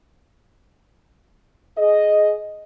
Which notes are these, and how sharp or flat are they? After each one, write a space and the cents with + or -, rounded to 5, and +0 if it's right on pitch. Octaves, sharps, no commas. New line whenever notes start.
G#4 +15 D#5 +0